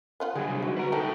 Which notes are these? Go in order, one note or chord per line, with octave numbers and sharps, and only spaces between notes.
B3 F4 F#5
D3 F#3 G3 G4 G#4
C3
D#4 F#4
F#4 B4 A#5
A3 D#4 E4 A4 G5 A#5